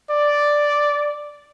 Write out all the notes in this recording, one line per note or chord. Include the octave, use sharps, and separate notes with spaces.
D5